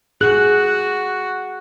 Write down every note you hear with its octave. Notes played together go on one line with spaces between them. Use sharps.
F#4 G#4 F#6